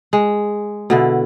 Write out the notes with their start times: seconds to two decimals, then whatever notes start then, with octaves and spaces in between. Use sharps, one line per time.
0.13 G#3
0.90 B2 D3 E4